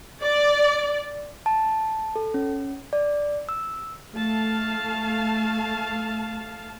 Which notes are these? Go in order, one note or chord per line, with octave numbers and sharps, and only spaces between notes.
D5
A5
A4
C#4
D5
E6
A3 F5 A5